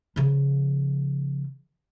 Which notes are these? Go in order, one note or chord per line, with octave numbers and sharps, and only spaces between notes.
C#3 F3